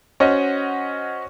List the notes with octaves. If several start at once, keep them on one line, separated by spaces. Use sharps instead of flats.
C#4 F#4 C5 C#5 D#5 F#5